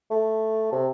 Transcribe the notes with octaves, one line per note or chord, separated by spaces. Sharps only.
A3
C3